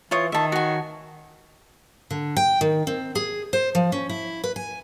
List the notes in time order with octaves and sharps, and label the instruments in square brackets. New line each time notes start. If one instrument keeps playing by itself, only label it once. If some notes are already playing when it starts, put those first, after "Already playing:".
[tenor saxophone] E3 [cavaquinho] F4 C#5 D#6
[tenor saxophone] D#3 [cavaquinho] E5 A5
[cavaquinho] F#4 G#5
[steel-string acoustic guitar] D3
G5
D#3
C4
G#4
C5
F3
C#4
E4
B4
G#5